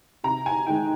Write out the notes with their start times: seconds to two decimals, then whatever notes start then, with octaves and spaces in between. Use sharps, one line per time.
0.24 C3 A#5
0.46 G#5
0.66 D#3 G#3 G5